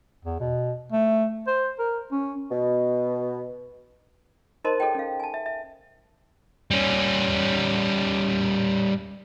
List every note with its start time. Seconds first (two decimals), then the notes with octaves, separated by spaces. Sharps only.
0.25 E2
0.40 B2
0.92 A3
1.47 C5
1.79 A#4
2.12 C#4
2.51 B2
4.64 D#4 A#4 C5 D#5 A5 C6
4.80 G#4 A4 C#5 D#5 G5
4.95 C#4 F5
5.20 G#5 A5
5.34 E5
5.46 E5
6.71 G3 C#4